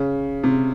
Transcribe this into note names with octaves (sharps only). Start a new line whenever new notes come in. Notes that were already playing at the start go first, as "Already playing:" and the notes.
Already playing: C#3
C3